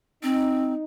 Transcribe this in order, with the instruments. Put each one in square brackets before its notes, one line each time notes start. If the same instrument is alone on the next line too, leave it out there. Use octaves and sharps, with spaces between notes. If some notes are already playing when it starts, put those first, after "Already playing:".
[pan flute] C4 [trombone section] D#4